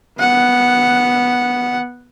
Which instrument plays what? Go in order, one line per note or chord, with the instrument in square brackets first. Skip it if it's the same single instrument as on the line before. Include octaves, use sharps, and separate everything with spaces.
[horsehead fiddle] B3 F#5